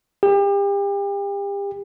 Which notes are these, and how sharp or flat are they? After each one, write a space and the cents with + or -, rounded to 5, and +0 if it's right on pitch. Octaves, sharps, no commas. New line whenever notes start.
G4 +35